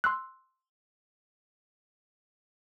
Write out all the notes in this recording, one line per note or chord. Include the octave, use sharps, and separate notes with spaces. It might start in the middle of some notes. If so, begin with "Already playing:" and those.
C6 E6 F#6